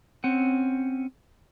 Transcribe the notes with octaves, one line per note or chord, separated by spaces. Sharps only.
C4 C#4 F#5